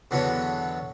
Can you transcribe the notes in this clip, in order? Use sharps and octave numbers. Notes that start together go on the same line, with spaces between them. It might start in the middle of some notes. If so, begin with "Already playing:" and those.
E2 D3 F#3 B3 C#5